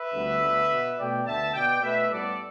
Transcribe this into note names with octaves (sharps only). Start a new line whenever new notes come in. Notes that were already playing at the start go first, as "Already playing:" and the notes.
Already playing: B4 E5
D2 D3 G3 B3
D2 D3 B3
B2 B3
B2 A3 D5 G5
D2 D3 B3 E5 A5
B2 B3 D5 G5
B2 A3 B4 E5
A2 G3 B3 A4 D5